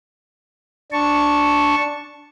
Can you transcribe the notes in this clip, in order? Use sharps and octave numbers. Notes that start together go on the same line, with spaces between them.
D4 A5 C#6